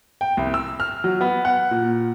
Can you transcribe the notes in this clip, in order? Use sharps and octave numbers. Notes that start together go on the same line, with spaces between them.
G5
C2
E6
F6
F#3
B3
F#5
A#2